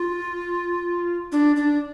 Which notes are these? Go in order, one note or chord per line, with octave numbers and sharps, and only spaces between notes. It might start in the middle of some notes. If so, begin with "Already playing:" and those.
Already playing: F4
D4
D4